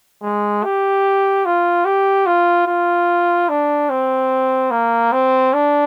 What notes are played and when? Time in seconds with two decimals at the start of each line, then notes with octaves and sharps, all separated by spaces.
0.23 G#3
0.64 G4
1.46 F4
1.85 G4
2.26 F4
2.67 F4
3.49 D4
3.90 C4
4.71 A#3
5.13 C4
5.53 D4